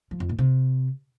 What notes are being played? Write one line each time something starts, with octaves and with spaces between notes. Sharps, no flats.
F3
F2
A#2
C3